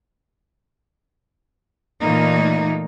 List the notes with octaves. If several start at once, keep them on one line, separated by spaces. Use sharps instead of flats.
A#2 E3 A3 A#3 D#4